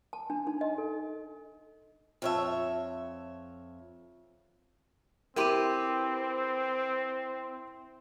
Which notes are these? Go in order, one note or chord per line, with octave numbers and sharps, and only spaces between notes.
A5
D4
D#4
D#5
A4
F2 C#5 E5
C4 E4 G4 A#4 B4 G5 C6 D#7